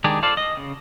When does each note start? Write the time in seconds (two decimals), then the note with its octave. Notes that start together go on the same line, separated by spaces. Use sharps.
0.04 D#3 G#3 D4 G4 G#4
0.23 F4 A4 C5 D5 F5
0.37 D#5
0.57 C#3